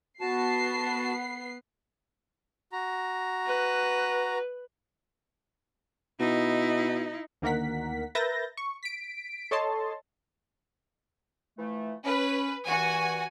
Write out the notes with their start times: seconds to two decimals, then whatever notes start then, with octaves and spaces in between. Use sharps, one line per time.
0.21 B3 F#4 A5 C7
2.72 F#4 A#5
3.47 B4
6.20 B2 D#4 E4
7.42 D2 D#3 A#3 A#4 F#5 B6
8.15 A#4 B4 E5 G6 A6 A#6
8.57 C#6
8.83 B6 D7
9.51 A4 C#5 D#5 A5 C6
11.58 E3 F3 A3
12.05 C#4 B4
12.68 G2 A#2 E3 F#4 G#5